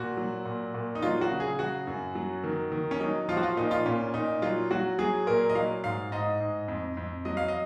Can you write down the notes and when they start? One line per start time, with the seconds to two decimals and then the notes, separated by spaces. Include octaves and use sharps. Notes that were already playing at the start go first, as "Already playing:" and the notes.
Already playing: A#2 F#4
0.17 F#3
0.46 A#2
0.74 A#2
0.95 D#4
1.02 F#3 F4
1.21 F#4
1.31 C#3
1.40 G#4
1.59 F#3 F#4
1.87 F#2
2.15 F#3
2.44 D#3
2.72 D#3
2.91 C#4
3.00 F#3 D#4
3.29 F3 F4
3.37 F#4
3.43 F4
3.57 A#2 D#4
3.71 F4
3.86 A#2 C#4
4.14 A#2 D#4
4.42 F#3 F4
4.71 F#3 F#4
4.98 F#3 G#4
5.27 A#2 A#4
5.50 D#5
5.55 F#3 F5
5.84 G#2 F5
6.12 G#2 D#5
6.40 G#2
6.68 F2
6.97 F2
7.25 F#3 D#5
7.37 F5
7.48 D#5